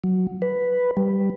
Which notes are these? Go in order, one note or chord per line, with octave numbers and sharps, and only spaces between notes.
F#3
B4
G3